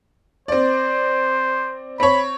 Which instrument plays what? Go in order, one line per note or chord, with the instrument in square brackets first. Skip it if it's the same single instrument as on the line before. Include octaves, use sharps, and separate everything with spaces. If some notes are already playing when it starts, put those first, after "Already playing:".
[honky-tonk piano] C4 D5 [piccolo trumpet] C5
[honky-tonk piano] C4 C#5 [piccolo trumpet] B5